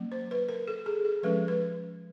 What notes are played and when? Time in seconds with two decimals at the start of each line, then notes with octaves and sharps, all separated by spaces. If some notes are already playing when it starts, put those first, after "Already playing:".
Already playing: F#3 A#3 C#4
0.12 C5
0.31 B4
0.49 A#4
0.68 A4
0.86 G#4
1.05 A4
1.23 F3 G#3 C#4 B4
1.48 B4